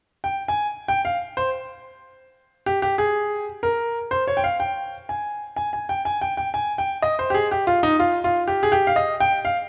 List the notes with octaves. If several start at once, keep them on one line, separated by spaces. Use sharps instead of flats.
G5
G#5
G5
F5
C5
G4
G4
G#4
A#4
C5
C#5
G5
F5
G5
G#5
G#5
G#5
G5
G#5
G5
G5
G#5
G5
D#5
C5
G4
G#4
G4
F4
D#4
F4
F4
G4
G#4
G4
F5
D#5
G5
F5